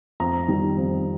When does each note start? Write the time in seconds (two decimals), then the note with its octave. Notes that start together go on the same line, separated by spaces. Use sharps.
0.20 F2 A#5
0.48 D#3 G3
0.77 F2